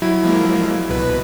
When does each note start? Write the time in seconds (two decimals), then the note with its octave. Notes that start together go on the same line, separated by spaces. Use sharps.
0.02 F#3 E4
0.23 F3 G#3 A#3
0.89 C2 B2 B4